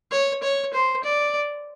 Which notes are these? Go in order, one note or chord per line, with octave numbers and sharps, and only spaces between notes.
C#5
C#5
C5
D5